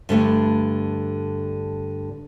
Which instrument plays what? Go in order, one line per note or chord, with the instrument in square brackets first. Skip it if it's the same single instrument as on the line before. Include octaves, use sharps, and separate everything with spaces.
[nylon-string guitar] G2 D3 A3